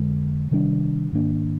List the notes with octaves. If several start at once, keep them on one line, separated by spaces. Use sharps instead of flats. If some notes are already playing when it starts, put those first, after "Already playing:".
Already playing: F2 D3 G#3
C3 D#3 G3 D4
G#2 D#3 A#3 D4